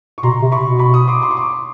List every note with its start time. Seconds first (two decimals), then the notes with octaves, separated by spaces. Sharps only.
0.18 C#6
0.23 B2 A#5 C6
0.42 C3
0.51 B5 C#6
0.62 B2
0.79 B5 C#6
0.94 C#6 D#6
1.08 C6 D6
1.22 C6 D6
1.31 C#6
1.37 C6 D6